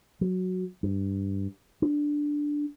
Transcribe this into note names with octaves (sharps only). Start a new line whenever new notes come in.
F#3
G2
D4